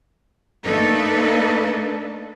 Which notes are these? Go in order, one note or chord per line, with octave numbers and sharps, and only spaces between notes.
A3 A#3 D4 D#4 A4 B4